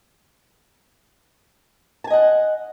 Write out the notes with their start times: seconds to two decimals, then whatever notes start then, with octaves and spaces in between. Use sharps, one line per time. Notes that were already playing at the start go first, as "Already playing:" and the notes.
2.04 A5
2.07 G#5
2.10 D#5
2.13 F#5